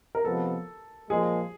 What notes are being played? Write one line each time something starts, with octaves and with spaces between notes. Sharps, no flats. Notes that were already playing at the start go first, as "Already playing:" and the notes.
A#4
C3 F3 G#3 B3 A4
A#2 F3 G#3 G#4